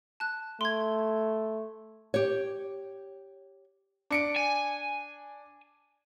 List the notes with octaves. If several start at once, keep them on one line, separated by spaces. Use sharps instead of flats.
A5 F#6
A3 C6 G#6
G4 C#5
D4 C#7 D7
G#5